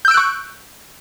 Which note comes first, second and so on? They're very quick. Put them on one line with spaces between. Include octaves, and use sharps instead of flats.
G6 E6 D7 F#6 C#6